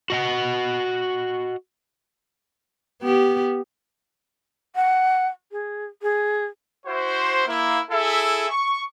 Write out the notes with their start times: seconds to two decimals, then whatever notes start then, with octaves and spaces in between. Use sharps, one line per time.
0.10 F#4 D#5 F#5
3.02 B3 G4
4.76 F#5
5.52 G#4
6.02 G#4
6.87 E4 F#4 C5
7.47 A#3 E4
7.90 E4 G#4 A4 E5
8.49 C#6